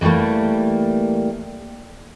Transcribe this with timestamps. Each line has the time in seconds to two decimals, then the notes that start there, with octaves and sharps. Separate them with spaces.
0.01 E3 F3 G3 A3 A#3